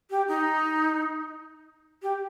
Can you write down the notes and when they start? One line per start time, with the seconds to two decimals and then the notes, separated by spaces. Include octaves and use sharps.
0.10 G4
0.28 D#4
2.02 G4